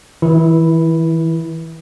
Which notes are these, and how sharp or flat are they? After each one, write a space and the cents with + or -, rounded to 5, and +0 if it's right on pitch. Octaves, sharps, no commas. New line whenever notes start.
E3 -30 E4 +0